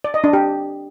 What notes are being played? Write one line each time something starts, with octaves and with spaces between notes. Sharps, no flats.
D5
D#5
D4
G4